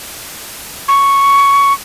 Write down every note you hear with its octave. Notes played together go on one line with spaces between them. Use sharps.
C#6